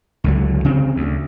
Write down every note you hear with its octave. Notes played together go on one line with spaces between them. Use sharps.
C#2 D3 F#3
C#3 C4
D2